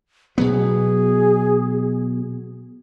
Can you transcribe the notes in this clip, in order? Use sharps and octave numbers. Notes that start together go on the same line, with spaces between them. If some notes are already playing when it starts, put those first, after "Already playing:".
B2 F#3 B3 G#4